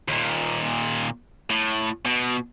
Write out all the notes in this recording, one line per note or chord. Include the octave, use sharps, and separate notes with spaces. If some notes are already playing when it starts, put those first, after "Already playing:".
D#2 A#2
A2
B2